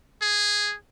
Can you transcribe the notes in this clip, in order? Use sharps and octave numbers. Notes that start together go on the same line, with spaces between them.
G#4